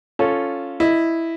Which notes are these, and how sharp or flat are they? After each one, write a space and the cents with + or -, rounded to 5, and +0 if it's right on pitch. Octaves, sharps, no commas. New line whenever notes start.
C#4 +0 F4 +0 A4 +0
E4 +0 D#5 +0